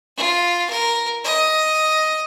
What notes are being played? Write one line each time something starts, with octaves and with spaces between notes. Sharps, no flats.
F4
A#4
D#5